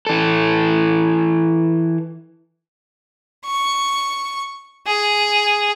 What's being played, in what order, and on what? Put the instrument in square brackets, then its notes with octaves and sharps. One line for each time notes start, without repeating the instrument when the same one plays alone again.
[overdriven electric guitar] E3 A4
[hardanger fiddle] C#6
G#4